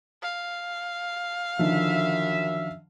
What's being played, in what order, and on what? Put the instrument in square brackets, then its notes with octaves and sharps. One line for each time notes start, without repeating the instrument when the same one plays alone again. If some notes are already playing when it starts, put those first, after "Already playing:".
[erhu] F5
[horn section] F#2 E5 [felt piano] D3 D#3 F3